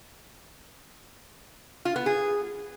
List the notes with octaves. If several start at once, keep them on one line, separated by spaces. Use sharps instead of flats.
F4
B3
G#4